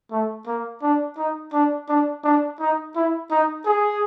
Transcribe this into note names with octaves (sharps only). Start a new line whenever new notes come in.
A3
A#3
D4
D#4
D4
D4
D4
D#4
E4
D#4
G#4